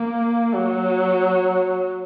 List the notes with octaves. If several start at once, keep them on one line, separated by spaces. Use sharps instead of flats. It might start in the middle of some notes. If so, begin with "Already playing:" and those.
Already playing: A#3
F#3